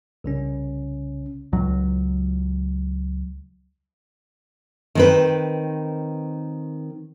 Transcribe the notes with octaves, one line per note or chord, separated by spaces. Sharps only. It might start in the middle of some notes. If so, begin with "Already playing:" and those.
C2 C#3 C#4
C#2 F#3
D#3 C4 B4